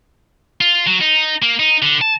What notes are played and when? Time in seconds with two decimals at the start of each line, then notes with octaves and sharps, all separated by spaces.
0.61 F4
0.87 F#3
1.01 D#4
1.42 A#3
1.59 D#4
1.82 D3
2.01 A5